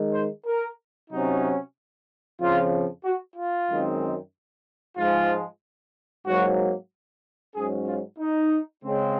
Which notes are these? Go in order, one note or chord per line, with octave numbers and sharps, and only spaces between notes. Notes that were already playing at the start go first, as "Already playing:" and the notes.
Already playing: D#3 G#3 D#4
C5
A#4
C3 F#3 C#4 D#4
F2 C#3 F3 F4
F#4
F4
F#2 D#3 G#3 C4 D#4
G#2 F3 G#3 F4
G#2 F#3 A#3 F#4
G#2 F#3 C#4 G#4
F4
D#4
C#3 G#3 C4